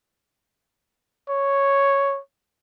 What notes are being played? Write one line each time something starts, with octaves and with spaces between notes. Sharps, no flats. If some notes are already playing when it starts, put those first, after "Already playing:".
C#5